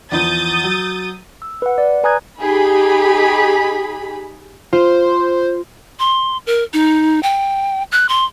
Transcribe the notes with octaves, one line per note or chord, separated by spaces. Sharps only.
E2 E3 F3 D#6 G6 A6
F#3
E6
B4 F#5
D5
B4 G#5 A#5 D#6 F#6 G#6
D#4 G4 G#4 B5
F4 C5
C6
A#4
D#4
G5
F#6
C6